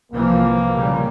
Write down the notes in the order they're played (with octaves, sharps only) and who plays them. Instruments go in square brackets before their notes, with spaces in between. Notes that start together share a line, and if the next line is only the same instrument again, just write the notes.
[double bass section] C2 E3 F3 [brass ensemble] A#3
[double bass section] A#2 C#3 G3